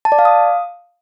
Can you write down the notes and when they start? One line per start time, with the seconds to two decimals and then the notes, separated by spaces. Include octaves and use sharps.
0.05 A5
0.12 D5
0.19 F5
0.25 D#6